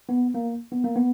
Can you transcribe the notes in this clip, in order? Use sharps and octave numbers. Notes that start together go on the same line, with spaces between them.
B3
A#3
B3
A#3
B3